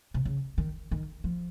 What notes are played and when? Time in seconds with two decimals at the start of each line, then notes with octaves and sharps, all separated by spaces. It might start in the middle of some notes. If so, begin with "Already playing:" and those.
0.14 C3
0.25 C#3
0.58 D#3
0.91 D#3
1.24 F3